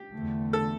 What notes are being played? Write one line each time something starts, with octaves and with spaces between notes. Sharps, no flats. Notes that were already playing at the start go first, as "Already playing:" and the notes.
Already playing: G4
E2 D3 A3
A4